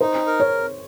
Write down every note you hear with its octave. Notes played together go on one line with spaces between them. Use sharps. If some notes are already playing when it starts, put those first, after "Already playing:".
D#4 C5
A#4
C#5